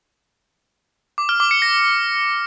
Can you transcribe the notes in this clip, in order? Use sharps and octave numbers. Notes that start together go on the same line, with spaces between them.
D6
F6
D6
C#7
A#6